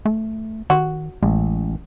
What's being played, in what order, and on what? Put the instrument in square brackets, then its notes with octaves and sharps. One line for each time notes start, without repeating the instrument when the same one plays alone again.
[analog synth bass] A3
[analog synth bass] D#3 [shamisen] F#4
[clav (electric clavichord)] A1 [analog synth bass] G#3